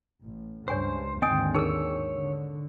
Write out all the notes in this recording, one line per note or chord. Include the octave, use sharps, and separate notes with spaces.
A1
C#2 G2 C5 C#5 G#5 C#6
G#1 D#2 D3 C4 D#5 G5 G#5 D#6
D#4 G#4 A#4 C#5 E6
D3